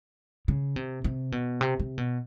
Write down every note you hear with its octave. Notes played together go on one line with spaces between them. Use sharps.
C#3
C3
C3
B2
C3
C3
B2